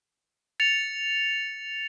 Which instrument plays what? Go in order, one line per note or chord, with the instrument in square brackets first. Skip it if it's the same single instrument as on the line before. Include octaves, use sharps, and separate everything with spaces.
[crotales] A6 C#7 F7